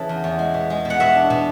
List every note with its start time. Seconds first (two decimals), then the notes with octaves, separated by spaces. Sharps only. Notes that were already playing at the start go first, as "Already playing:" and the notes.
Already playing: C#3 E3 A5
0.09 E2
0.24 E2
0.39 G#3
0.54 B2
0.70 G#3
0.85 B2
0.90 F#5
1.00 B2 E5
1.15 D4
1.30 B2